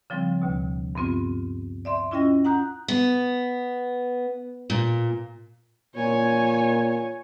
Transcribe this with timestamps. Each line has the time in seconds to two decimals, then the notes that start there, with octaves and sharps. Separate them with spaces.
0.10 C#3 F3 G3 C4
0.42 D2 B2
0.95 G2 B3 C4 F4
1.85 D5 E5 C6
2.11 C#4 E4 F4 D#5 G5 A#6
2.45 F#5 A#5 D#6 F#6 G6
2.88 B3
4.70 A#2
5.96 A#2 C#5 G#5